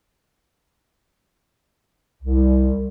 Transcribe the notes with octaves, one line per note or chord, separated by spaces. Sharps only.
C2